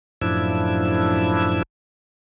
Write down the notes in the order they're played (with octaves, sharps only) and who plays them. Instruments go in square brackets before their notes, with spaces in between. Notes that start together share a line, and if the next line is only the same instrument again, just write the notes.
[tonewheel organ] F#2 A2 F3 D4 E4 E6